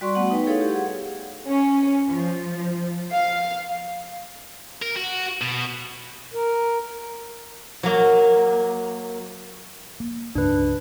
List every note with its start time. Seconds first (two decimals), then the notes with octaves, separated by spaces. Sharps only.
0.01 G3 F#4 D5 C6 C#6
0.15 A3 B3 F#5
0.30 D#4 B4 G5
0.46 E4 G#4 A4 C#5 F5
0.61 G4
0.73 G#4 F#5
1.48 C#4
2.07 F3
3.12 F5
4.82 A#4
4.97 F#4
5.41 B2
6.34 A#4
7.83 F#3 A#3
10.00 A#3
10.35 C#2 G2 C#3 D4 B4